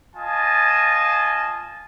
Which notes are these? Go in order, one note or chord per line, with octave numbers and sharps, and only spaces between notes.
F4 D#5 G#5 A5